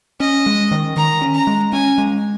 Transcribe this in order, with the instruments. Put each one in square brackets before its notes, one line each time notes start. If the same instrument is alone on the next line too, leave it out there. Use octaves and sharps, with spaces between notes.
[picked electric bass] C#4 [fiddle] D#5
[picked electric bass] G#3
D#3
[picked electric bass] D#3 [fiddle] A#5
[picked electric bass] C#4
[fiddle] A#5
[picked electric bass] G#3
[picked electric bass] C#4 [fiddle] G#5
[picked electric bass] G#3